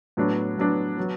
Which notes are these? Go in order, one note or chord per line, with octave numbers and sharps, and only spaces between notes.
A2 F#3 B3 D4
A2 F#3 B3 D4
F#3 B3